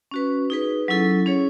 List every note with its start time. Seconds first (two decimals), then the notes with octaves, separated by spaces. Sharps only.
0.11 C#4 F#4 B4
0.50 D#4 G#4 B4
0.88 F#3 C#4 E4 A4
1.26 C#4 G#4 C#5